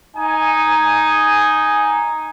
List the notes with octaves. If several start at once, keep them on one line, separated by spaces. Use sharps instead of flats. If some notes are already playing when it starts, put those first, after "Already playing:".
D#4 G#5